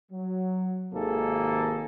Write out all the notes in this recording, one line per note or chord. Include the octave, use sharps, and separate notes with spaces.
F#3
G#1 C3 D#3 A#3 G#4 A4